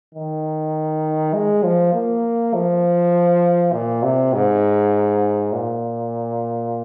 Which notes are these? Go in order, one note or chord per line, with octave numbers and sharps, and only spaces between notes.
D#3
G#3
F3
A#3
F3
A#2
C3
G#2
A#2